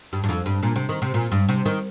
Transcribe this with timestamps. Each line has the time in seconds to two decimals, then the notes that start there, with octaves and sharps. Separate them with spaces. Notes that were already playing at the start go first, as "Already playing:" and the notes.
0.13 G2
0.24 G2
0.29 F2
0.46 G2
0.63 A#2
0.76 C3
0.89 D#3
1.02 C3
1.14 A#2
1.32 G2
1.49 C3
1.66 D#3